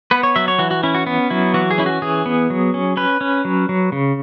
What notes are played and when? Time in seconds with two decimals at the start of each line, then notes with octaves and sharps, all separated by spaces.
0.11 B3 B4
0.23 C#5
0.36 F#3 E5
0.48 C#5
0.59 E3 F#4
0.71 F#4
0.83 C#4 E4
0.95 F#4
1.07 B3
1.30 F#3 E4
1.54 E3 F#4
1.71 G#4
1.78 C#4 E4
1.86 F#4
2.02 E3 G#4
2.26 B3
2.50 F#3
2.74 C#4
2.97 C#4 B4
3.21 C#4
3.45 F#3
3.69 F#3
3.92 C#3